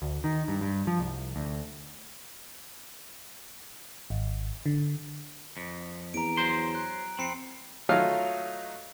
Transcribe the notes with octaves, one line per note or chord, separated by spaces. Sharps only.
D2
D#3
G2
G2
F3
C2
D2
G#1
D3
F2
E2 A#5 D7
F#3 C5 C6
F#6
F2 C4 B5 C7 C#7
F#3 A3 D#4 F4 F5